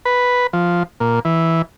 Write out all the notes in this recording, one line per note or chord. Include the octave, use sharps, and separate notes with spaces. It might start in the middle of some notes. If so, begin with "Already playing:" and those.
B4
F3
A#2
E3